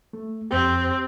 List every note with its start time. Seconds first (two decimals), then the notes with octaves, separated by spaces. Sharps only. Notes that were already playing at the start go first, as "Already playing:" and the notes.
0.13 A3
0.51 F2 C4 G4